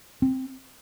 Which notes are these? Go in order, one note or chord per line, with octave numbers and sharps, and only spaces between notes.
C4